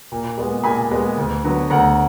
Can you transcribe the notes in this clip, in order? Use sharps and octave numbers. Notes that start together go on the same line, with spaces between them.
A#2
G#3 B3
A#2 G#5 B5
G#3 B3
D2
D3 F#3 B3
D2 F#5 A#5